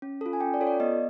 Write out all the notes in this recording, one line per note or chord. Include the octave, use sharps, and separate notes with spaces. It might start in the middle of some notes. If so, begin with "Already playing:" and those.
C#4
F4 A4
G#5
C#4 G5
D5
F4 A4 C#5
D5
B3 D#5